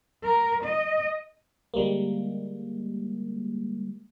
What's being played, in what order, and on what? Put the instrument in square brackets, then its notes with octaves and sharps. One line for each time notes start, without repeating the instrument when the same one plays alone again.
[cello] A#4
D#5
[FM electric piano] D3 G3 G#3 A#3